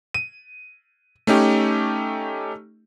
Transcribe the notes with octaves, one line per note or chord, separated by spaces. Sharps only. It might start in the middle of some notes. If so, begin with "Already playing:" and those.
D#7
A3 C#4 D#4 G4